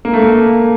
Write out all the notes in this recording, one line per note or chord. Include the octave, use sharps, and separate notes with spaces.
A#3
A3
A#3